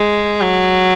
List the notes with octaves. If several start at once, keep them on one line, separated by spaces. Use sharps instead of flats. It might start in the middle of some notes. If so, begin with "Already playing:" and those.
Already playing: G#3
F#3